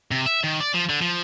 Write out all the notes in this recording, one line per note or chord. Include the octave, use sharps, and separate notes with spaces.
C3
E5
D#3
D5
F3
D3
F3